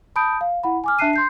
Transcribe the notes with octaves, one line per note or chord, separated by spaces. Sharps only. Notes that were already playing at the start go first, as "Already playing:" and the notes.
A5 B5 D#6 G6 D7
F5
E4 F#5 B5
G#5 D6 F6
D4 E5 A5 F#6 C7 D#7
C6 G6 C7